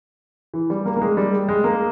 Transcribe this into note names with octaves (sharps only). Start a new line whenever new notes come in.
E3
G3
A#3
A#3
G#3
G3
G#3
A#3